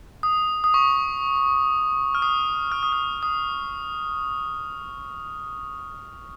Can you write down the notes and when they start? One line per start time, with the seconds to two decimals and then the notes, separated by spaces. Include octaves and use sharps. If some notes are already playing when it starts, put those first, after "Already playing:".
0.23 D#6
0.64 D#6
0.74 C#6
2.15 F6
2.22 D#6
2.72 F6
2.83 D#6
2.93 F6
3.23 D#6